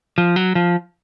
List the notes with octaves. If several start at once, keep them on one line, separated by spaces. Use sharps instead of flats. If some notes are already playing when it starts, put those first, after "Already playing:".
F3
F#3
F3